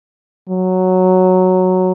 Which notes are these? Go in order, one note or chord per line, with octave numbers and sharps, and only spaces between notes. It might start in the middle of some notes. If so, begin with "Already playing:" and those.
F#3